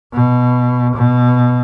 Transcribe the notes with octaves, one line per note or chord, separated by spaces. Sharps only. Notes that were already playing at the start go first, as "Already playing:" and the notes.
B2
B2